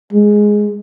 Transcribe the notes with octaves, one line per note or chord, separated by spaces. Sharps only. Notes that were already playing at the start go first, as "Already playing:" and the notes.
G#3